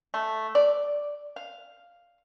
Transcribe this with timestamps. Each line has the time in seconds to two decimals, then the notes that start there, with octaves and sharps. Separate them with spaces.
0.14 A3
0.55 D5
1.36 F5